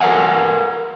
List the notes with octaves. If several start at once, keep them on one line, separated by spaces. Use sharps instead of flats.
A4 A#4 C#5 F5 F#5 G#5